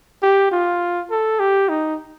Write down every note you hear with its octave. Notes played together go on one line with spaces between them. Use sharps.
G4
F4
A4
G4
D#4